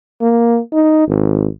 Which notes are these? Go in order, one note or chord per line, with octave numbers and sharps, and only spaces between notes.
A#3
D#4
G#1